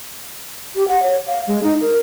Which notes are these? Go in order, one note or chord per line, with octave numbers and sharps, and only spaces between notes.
G4
F#5
C#5
F5
G#3
D#4
A#4